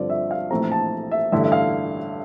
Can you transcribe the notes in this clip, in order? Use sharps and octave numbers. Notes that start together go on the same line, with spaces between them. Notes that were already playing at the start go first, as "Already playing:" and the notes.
Already playing: G2 D3 F3 C4 D5
E5
F5
A#1 A2 E3 A3 C4 A#5
A5
E5
A1 G2 D3 A3 E5
E5
F5